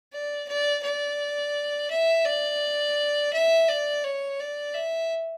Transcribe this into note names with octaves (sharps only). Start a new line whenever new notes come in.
D5
D5
D5
E5
D5
E5
D5
C#5
D5
E5